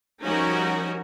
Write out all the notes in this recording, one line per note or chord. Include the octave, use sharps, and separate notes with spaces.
F3 G3 C#4 D#4 F#4 A#4